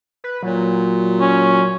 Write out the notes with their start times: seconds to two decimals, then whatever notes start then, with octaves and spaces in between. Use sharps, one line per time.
0.24 B4
0.43 A#2 F#3
1.21 C#4